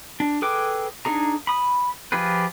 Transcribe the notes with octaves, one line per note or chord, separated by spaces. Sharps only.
D4
G#4 A4 B4 G5 D6
D4 D#4 G#4 A#5
B5 D#6
F3 F4 G4 G#4 B4